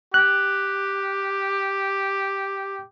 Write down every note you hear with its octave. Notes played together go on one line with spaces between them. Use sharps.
G4 F#6